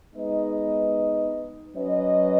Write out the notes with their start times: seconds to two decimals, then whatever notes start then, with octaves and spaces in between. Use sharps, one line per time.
0.15 G#3 B3 D#4 B4 D#5
1.76 F#3 C#4 B4 D#5